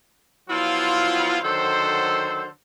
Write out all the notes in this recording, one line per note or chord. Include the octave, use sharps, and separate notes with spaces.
F3 F#3 B3 E4 F4
D3 D#3 F#3 A4 C5